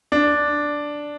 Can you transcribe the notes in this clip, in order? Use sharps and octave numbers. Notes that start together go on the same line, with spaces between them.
D4